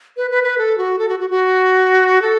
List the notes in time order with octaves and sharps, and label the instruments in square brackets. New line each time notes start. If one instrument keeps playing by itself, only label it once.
[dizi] B4
B4
B4
A4
F#4
A4
F#4
F#4
F#4
A4